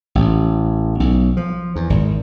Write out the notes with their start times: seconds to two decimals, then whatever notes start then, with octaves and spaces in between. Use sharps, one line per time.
0.15 A1
1.00 B1
1.37 F3
1.76 E2
1.90 G#1